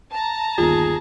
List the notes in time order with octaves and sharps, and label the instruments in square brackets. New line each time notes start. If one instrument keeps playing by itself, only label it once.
[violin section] A5 A#5
[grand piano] G1 D#2 D#3 [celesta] F4 [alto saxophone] G#4